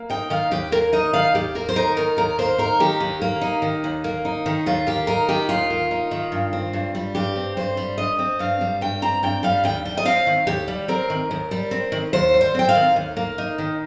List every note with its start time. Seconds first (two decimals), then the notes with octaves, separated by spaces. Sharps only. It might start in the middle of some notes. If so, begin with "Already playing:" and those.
Already playing: A#3
0.10 D#4 G5
0.30 D#3 F5
0.51 D#2 G4
0.72 A#3 A#4
0.93 D#4 D#5
1.13 D#3 F5
1.35 D#2 G4
1.55 A#3 A#4
1.69 C5
1.76 D#4 A#4
1.96 D#3 A#4
2.17 D#2 A#4
2.38 A#3 C5
2.58 D#4 A#4
2.80 D#3 G4
3.00 D#2
3.22 A#3
3.41 D#4
3.62 D#3
3.84 D#2
4.04 A#3
4.25 D#4
4.46 D#3
4.66 D#2 F4
4.87 A#3 G4
5.07 D#4 A#4
5.29 D#3 G4
5.49 D#2 F4
5.70 A#3
5.91 D#4
6.11 D#3
6.32 G2
6.53 C4
6.73 G2
6.95 G3
7.15 G2 G4
7.36 C4
7.57 G2 C5
7.77 G3
7.98 G2 D#5
8.19 C4
8.39 G2 F5
8.61 G3
8.81 G2 G5
9.02 C4 A#5
9.23 G2 G5
9.43 G3 F5
9.64 D#2 G5
9.86 G3
9.97 D#5
10.05 C4 F5
10.26 D#3
10.47 D#2 G4
10.68 G3
10.88 C4 A#4
11.10 D#3
11.31 D#2
11.51 G3
11.71 C4
11.92 D#3
12.13 D#2 C5
12.34 G3
12.41 C5
12.55 C4 G5
12.69 F5
12.75 D#3
12.96 D#2
13.17 A#3
13.38 D#4
13.58 D#3